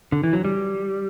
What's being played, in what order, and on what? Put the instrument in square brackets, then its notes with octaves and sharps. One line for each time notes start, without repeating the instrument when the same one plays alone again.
[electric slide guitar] D3
E3
F#3
G3